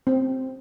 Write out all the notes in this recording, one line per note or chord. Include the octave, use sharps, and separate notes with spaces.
C4